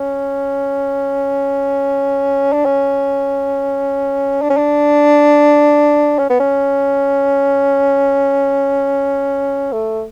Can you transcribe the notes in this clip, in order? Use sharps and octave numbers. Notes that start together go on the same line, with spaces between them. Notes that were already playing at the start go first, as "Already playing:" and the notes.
Already playing: C#4
D4
C#4
D4
C#4
D4
C#4
B3
C#4
A3